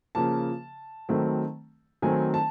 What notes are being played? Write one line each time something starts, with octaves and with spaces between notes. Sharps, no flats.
C#3 F3 A#3 A5
D#3 F#3 A3 C4
D#3 F#3 A3 C4 G#5
A5